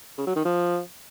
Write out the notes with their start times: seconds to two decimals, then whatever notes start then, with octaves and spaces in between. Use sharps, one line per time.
0.18 C#3
0.27 F#3
0.36 D#3
0.45 F3